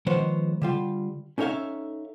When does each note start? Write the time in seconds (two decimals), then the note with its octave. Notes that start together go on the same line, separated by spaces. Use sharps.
0.06 D#3 F3 G#3 B3 C5 C#5
0.62 D3 G3 F4
1.38 C#4 D#4 A4 C#5 E5 F5